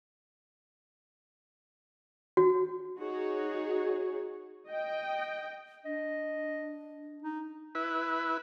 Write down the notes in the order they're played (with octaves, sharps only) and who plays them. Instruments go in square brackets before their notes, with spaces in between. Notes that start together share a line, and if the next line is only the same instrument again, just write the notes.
[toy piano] F#4
[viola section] D#4 F#4 G#4 C#5
D#5 G5
[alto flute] D4 [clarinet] D#5
[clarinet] D#4
[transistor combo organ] E4 B4